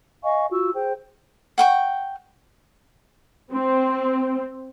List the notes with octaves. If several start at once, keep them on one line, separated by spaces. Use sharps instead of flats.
D#5 F5 G#5 C#6
F4 F#4 C#6 E6
G#4 C5 G5
F#5 G5 C#6
C4